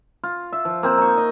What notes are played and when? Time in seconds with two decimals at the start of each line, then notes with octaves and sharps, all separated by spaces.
0.24 F4
0.53 E5
0.65 F3
0.83 A#3 C4 C5
0.98 D#4 C#6
1.17 D#5